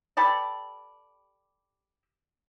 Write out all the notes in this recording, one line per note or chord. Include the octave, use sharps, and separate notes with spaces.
G4 A4 B4 D5